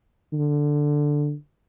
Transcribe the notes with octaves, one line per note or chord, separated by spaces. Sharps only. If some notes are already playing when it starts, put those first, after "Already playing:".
D3